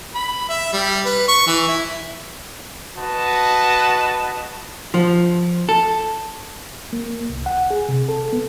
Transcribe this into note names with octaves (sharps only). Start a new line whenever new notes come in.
B5
E5
G3
B4
C#6
E3
E4
F#4 B4 D#5 A5
F3
A4
A#3
C2
F#5
G#4
C3
A4
B3